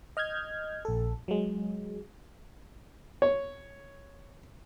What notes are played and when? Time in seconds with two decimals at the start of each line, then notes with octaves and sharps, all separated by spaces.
0.17 D#5 F6 G6 G#6
0.85 A#1 A4
1.28 F#3 G#3
3.22 C#5